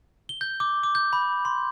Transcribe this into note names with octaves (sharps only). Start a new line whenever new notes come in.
G7
G6
D6
D6
G6
B5
C6